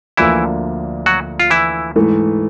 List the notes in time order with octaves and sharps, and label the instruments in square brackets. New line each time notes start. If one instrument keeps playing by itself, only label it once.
[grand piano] D2 D3 F3 A#3 D4 [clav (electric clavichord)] E3 E4
[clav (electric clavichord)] F#3 F#4
F4
E3 E4
[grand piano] G#2 E3 A3